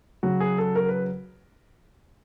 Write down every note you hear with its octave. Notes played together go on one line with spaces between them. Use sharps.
C#3 F#3 F#4
G#4
A4
A#4
B4